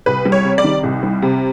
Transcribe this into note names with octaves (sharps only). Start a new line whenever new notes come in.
C2 B4
G3
C#5
C3
D5
D#3
C2
G3
C3